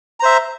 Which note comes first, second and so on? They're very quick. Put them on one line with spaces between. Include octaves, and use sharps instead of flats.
A#5 C5 E5